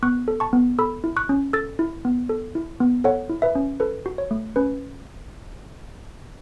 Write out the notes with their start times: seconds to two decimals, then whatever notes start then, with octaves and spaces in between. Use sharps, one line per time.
0.03 B3 C#6 F#6
0.28 A4
0.40 A5 C#6
0.53 B3
0.79 A4 B5 E6
1.04 E4
1.16 C#6 F#6
1.29 C#4
1.53 A4 E6 A6
1.79 E4
2.05 B3
2.29 A4
2.55 E4
2.80 B3
3.04 A4 C#5 F#5
3.29 E4
3.42 B4 E5
3.55 C#4
3.80 A4 B4
4.06 F#4
4.18 C#5
4.31 A3
4.56 C#4 B4